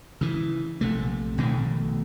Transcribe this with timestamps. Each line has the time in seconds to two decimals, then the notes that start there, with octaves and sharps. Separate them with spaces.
0.21 C#3 E3
0.81 A#1 C3 A3
1.38 A#1 B2 D#3 A3